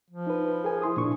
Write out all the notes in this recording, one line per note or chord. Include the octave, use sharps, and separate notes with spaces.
F3
D#4 B4
G#4 A#4 G#5
E4 C6 D#6
A#2 D4 C#6